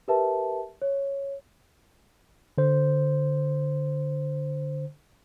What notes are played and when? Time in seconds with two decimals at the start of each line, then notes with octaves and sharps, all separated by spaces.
0.08 G4 A#4 B4 E5 A5
0.82 C#5
2.58 D3 C5